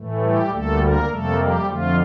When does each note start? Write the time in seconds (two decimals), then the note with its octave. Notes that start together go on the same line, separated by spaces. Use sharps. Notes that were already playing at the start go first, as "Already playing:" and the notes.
Already playing: A2 E3 A3
0.20 G3 G4
0.49 D2 D3 G3 A3 A#3 A4
0.78 A#3 A#4
1.07 F2 C3 G3 A3 A#3 A4
1.36 G3 G4
1.65 F2 D3 F3 A3 F4